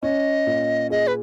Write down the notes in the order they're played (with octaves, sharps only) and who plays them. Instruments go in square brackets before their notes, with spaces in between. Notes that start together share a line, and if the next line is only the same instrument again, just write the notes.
[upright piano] C#4 [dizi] D#5
[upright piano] A#2
[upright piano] G#4 [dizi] D#5
[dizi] B4